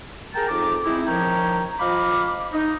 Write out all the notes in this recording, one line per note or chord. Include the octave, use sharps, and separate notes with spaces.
G#4 A#4 G5 A5 A#5
F2 D#4 D6
G#3 C4 D#4 E4
D#3 F3 C#4 G5 A#5
F3 D#5 F5 B5 D6
D#4